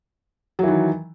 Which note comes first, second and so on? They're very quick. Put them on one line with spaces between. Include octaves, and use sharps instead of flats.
F#3 E3 D#3